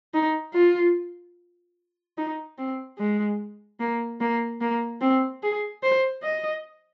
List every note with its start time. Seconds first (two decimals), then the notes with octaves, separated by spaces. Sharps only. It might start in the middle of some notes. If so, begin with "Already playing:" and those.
0.14 D#4
0.54 F4
2.18 D#4
2.58 C4
2.98 G#3
3.80 A#3
4.21 A#3
4.61 A#3
5.02 C4
5.43 G#4
5.83 C5
6.23 D#5